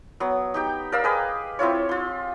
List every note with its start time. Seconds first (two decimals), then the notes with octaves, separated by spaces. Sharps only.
0.20 F#3 B3
0.54 D#4 G4 G5
0.92 A#4 D5 F5 E6
1.04 G4 G#4 B4 D#5
1.59 C4 E4 F4 C#5
1.89 F4 C6